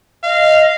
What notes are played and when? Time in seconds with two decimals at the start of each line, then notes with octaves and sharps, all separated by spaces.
0.24 D#5 F5